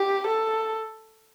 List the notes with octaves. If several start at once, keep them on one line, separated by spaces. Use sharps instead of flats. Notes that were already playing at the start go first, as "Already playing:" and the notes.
Already playing: G4
A4